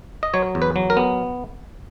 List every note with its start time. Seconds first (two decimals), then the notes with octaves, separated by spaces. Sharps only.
0.23 D#5
0.34 F#3 C#5
0.55 E2
0.62 B4
0.76 F#3
0.90 A#4
0.97 B3